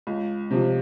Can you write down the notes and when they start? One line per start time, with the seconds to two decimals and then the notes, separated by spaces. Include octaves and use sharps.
0.07 C#2
0.51 C3 F3